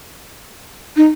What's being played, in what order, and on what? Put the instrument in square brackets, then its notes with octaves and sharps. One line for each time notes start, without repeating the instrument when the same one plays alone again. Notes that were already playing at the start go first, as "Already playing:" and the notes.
[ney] D#4